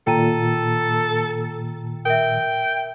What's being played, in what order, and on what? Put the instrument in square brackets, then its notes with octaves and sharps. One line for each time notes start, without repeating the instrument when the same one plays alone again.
[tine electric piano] A#2 D#3 [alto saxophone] A4 [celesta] G5 A#5 D#7
[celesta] A#4 E5 [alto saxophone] G5